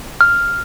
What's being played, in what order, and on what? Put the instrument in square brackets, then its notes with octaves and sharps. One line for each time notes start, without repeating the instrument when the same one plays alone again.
[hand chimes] F6